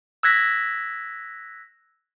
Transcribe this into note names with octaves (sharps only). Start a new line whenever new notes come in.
E6 F#6 G#6 A#6 B6